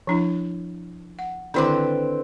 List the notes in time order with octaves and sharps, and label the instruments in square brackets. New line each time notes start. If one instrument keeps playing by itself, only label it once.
[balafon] F3 D4 E4
F#5
[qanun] D3 C4 B4 [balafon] D#3 E4 D6